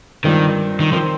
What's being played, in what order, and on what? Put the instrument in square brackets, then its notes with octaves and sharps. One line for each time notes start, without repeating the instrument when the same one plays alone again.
[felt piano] G2 G3 C4 F4 A#4 [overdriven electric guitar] D#3
[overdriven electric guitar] D#3
[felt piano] D#3 C4 [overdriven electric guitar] F3